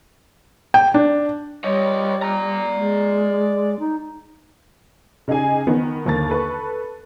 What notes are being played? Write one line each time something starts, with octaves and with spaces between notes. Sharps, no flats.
G5
D4
G3 C#5 D#5
D5 A#5
G#3
D#4
C#3 D#4 G4 G#4 G#5
D#3 B3
G1 D#2 A#3 A6
A4 B4 C#6